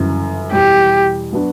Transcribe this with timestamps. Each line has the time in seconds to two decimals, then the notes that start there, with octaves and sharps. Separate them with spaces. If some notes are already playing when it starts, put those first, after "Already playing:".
Already playing: G1 F#2 C#3 E3
0.52 E2 B2 G3 G4
1.33 F#3 B3 D4 F#4